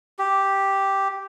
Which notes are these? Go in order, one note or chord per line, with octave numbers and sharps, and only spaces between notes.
G4